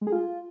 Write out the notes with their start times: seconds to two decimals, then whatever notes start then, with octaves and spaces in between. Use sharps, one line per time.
0.01 G#3
0.07 G#4
0.12 F4